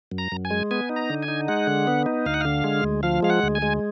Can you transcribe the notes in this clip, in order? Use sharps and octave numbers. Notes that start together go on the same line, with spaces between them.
F#2
A#5
F#2
G#5
G#3
B3 G#5
D#4
A#5
D3
G#5
D#4
G#3 F#5
D3
B3
D#4
D2 F5
F#5
D3 F5
G#3
D2
F3 F5
G#3 F5
F#5
D2
G#5
G#3